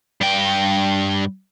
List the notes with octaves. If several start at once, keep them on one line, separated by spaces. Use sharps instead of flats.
G2 G5